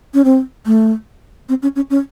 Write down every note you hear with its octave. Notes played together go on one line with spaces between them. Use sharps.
C#4
C4
A3
C4
C#4
C#4
C#4